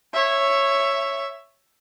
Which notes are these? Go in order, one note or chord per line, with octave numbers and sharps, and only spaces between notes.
C#5 E5